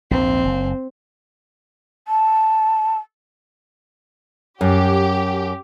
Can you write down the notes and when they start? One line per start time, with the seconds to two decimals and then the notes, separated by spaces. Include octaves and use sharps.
0.11 A#1 D#2 G#2 C4
0.45 F#1
2.08 A5
4.61 F#2 G4